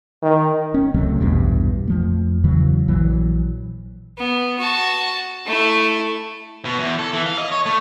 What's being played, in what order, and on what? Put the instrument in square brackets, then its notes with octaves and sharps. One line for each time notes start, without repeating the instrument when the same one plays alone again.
[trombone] D#3
[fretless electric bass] C#4
C#2 C3 F#3 A3
A#1 E2 G2 B2
F2 F3 A3
E2 C#3 E3 F#3
A#1 E3 F#3
[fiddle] B3
F#4 A5
A3 E4
[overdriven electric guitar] B2
E2
A4
E3
F5
D#5
C#5
A3